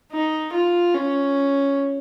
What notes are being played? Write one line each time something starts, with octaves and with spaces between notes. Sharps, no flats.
D#4
F4
C#4